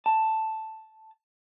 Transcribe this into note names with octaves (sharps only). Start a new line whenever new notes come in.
A5